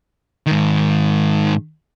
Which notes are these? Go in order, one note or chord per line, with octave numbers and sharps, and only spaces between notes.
G#2 D#3